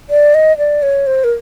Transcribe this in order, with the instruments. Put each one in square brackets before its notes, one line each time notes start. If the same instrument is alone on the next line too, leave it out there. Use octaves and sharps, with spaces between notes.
[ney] D5
D#5
D5
C#5
C5
A#4